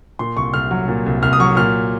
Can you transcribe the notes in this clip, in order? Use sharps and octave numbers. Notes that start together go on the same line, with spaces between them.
A#2 C6
C2 C#6
C2 F6
F#3
A#2
C2
C2 F6
D#6
F#3 C#6
A#2 F6